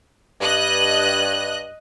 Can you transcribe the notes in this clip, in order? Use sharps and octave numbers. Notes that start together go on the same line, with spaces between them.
G2 D#5 F#6